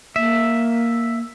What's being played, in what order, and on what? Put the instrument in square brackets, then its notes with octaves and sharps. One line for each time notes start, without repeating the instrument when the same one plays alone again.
[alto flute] A#3 [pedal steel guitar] E5